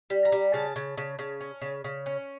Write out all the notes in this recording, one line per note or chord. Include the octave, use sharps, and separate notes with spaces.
G3
A#5
G3
C#3 A5
C#3
C#3
C#3
C#4
C#3
C#3
C#4